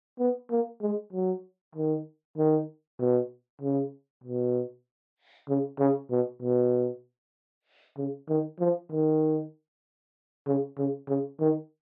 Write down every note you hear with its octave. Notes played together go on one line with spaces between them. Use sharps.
B3
A#3
G#3
F#3
D#3
D#3
B2
C#3
B2
C#3
C#3
B2
B2
C#3
D#3
F3
D#3
C#3
C#3
C#3
D#3